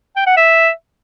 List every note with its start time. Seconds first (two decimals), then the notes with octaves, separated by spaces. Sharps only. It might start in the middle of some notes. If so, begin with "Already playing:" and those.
0.16 G5
0.27 F#5
0.37 E5